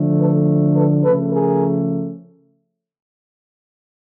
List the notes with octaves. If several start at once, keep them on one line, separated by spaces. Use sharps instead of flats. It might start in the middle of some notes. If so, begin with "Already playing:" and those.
Already playing: D3 F3 A3
A4 B4
A4 B4
C#3 F3 A3 A4 B4
G#4 A#4